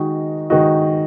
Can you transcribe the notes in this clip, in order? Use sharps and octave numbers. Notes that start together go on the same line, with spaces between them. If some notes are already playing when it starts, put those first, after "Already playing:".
Already playing: D#3 G#3 D#4 F#4
D#3 G#3 D#4 F#4